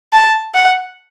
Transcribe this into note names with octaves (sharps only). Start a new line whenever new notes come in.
A5
F#5